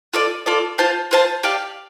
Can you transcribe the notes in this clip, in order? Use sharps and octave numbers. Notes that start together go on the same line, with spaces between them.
F4 A4 D5
F4 A4 D5
F4 C5 F5 A5
F4 C5 F5 A5
G4 D5 F5 A5